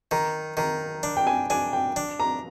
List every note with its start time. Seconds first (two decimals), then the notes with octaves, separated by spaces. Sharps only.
0.11 D#3 A#5
0.57 D#3 A#5
1.03 D4
1.17 G5
1.27 G#5
1.50 D4 G#5
1.73 G5
1.96 D4
2.20 A#5